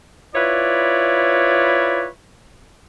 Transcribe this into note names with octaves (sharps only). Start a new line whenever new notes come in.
E4 F4 B4 C#5 D5